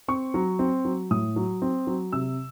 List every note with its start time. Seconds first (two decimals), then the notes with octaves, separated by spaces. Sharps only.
0.08 C4 C#6
0.34 F#3
0.59 C4
0.85 F#3
1.11 A2 D#6
1.36 F#3
1.62 C4
1.87 F#3
2.12 C3 E6